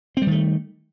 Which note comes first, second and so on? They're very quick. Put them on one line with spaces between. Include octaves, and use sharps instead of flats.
C4 G3 D#3 A3